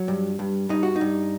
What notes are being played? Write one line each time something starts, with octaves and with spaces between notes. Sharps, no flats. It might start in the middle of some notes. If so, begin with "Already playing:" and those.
Already playing: F#3
G2
G2
G2 D#4
F#4
D#4
G2